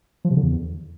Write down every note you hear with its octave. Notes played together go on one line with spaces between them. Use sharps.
F3
C3
D3
E2